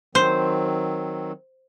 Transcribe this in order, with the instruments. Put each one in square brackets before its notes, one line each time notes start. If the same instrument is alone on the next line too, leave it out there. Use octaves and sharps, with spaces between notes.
[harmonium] D#3 F#3 C4 [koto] C5